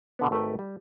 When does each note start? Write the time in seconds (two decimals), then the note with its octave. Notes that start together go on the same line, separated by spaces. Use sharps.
0.19 B2 D3 B3
0.31 G#1 A3 A#4 B4 G5
0.59 G3